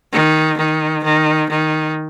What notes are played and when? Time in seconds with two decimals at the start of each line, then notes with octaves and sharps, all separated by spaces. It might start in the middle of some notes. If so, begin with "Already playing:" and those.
0.13 D#3
0.58 D#3
1.04 D#3
1.50 D#3